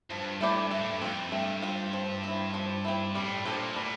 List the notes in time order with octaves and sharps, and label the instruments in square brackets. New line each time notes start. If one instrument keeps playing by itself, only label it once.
[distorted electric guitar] G2 [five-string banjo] F3
[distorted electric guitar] G2 [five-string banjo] A3 E4 G4 D5
[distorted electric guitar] G2 [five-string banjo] A3
[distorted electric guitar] A2
G2
[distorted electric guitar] F2 [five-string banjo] C4 F4
[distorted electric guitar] G2 [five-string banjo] A3
[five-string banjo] C4 F4
F3
C4 E4
F3
C4 E4
[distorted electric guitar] A2 [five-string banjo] G3
[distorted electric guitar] A#2 [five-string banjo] D4 A4 C5
[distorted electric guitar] A2 [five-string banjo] G3